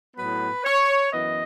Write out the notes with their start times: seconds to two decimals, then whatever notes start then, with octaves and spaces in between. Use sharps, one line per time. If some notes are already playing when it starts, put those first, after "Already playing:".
0.16 A2 F#3 B3 B4
0.64 C#5
1.12 F#2 E3 B3 D#5